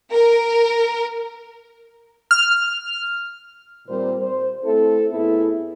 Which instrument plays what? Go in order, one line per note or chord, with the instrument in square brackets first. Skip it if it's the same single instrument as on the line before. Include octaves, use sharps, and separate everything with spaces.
[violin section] A#4
[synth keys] F6
[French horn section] A#2 D#3 G3 C4 A#4 C5
C5
A3 C4 E4 A4
A2 B3 E4 G#4 A4